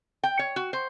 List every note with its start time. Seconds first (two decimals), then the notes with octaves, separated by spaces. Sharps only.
0.23 G5
0.39 C#5
0.56 F#4
0.73 C5